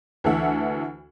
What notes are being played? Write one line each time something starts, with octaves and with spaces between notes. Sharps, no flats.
D2 E3 A4 E5 F#5